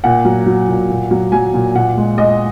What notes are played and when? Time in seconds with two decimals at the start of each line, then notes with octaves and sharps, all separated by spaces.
0.04 A#2 F#5
0.25 F#3
0.46 F#3
0.68 A#2
0.89 A#2
1.11 F#3
1.32 F#3 G#5
1.54 A#2
1.75 A#2 F#5
1.97 G#3
2.18 G#3 D#5